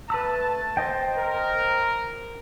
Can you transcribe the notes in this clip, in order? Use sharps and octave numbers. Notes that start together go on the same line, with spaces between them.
A3 B4 A5 B5 E6
C5 D#5 G5
A#4